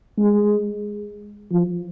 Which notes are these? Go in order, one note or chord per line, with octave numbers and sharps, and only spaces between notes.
G#3
F3